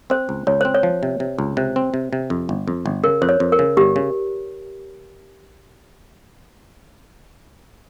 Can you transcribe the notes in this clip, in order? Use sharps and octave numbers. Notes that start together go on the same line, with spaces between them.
C4 C5
C#2
C#2 C#5
C4 C5
C#5
F3
C3
C3
C#2
C3 C5
C4
C3
C3
F2
G1
F2
G1
C#3 A#4
F2 C5
C#5
F2
A#4
C#3
G1 G4
C#3